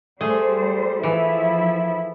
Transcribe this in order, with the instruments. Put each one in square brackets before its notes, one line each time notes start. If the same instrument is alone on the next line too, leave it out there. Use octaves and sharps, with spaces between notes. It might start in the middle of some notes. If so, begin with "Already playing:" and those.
[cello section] G3 C5 [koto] A3 G#4
[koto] E3 [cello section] F3 E4